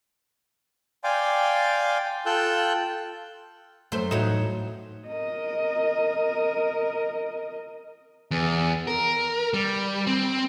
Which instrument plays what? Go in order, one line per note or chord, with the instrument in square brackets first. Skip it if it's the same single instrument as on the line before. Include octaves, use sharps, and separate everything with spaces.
[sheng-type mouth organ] D5 F5 G5 G#5 C6 D6
F4 A4 G5 E6 F#6 G6
[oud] F#2 C5 [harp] A3 C6
[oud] E2 F#3 D#4 [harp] A2 C#7 E7
[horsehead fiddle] A#4 D#5
[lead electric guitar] E2
A#4
G3
C4